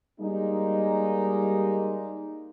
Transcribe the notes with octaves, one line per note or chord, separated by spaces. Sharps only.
G3 G#3 A#3 D#4